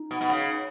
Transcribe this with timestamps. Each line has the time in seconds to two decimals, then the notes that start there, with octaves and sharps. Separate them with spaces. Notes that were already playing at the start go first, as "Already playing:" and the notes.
Already playing: D#4
0.11 B2
0.21 B2
0.29 C#3